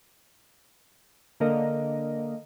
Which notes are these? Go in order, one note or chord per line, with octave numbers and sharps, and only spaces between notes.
D3 A#3 A#4 D#5